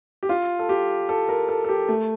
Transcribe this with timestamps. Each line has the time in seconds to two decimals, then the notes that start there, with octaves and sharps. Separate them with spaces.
0.23 G4
0.29 F4
0.59 A4
0.69 G4
1.09 A4
1.29 A#4
1.49 A4
1.64 A4
1.69 G4
1.89 A3